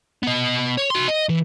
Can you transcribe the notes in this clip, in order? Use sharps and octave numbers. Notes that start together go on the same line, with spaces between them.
B3 D#5
C#5
F#4 C6
D#5
E3